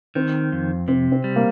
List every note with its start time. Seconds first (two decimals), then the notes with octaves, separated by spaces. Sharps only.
0.15 D#3 C4
0.52 F2
0.88 C3 C4
1.12 C4
1.24 G3
1.36 A#3